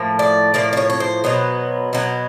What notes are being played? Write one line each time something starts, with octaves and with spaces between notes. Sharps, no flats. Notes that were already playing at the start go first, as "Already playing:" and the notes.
Already playing: A2 F3 A#3
D5
A2 F3 A#3 D5
D5
C#5
C#5
C5
B2 F#3 B3
B2 F#3 B3